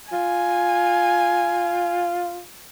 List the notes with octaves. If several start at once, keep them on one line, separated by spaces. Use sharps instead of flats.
F4 G#5